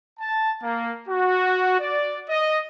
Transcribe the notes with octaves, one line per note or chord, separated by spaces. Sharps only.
A5
A#3
F#4
D5
D#5